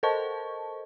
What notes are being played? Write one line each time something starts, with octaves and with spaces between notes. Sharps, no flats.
A4 A#4 C5 D#5 A5 C#6